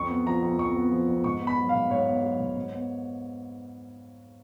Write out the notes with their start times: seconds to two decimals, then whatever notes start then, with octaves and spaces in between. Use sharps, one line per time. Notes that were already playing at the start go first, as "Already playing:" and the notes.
Already playing: F2 C#6
0.09 B3
0.26 F3 A#5
0.42 F2
0.59 F2 C#6
0.76 B3
0.91 F3
1.08 F2
1.24 G#2 C#6
1.41 B3
1.47 B5
1.58 F#3
1.69 F5
1.74 G#2
1.90 G#2 C#5
2.07 B3
2.23 F#3
2.39 G#2
2.56 G#2
2.72 B3